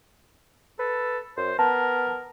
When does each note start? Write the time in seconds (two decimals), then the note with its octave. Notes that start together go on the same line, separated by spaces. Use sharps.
0.79 A4 B4
1.37 F#2 C5
1.59 B3 A#4 A5